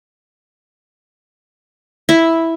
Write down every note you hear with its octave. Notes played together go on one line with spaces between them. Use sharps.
E4